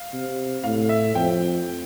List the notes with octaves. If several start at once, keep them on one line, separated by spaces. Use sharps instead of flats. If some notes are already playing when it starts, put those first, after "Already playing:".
Already playing: F5
C3
A2 F5
E5
F2 G5